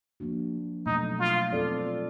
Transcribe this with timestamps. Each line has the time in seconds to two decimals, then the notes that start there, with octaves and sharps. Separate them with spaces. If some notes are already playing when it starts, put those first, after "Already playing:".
0.20 F3 A#3 D4 F#4
0.86 B2 F#3 A3 D#4
1.20 F4
1.53 C4 F4 A4 D5